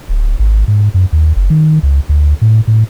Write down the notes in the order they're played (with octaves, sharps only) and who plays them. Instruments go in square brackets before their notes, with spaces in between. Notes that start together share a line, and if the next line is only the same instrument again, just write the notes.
[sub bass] D1
G#1
G#2
F#2
D#2
F#1
D#3
C#2
D2
A2
A2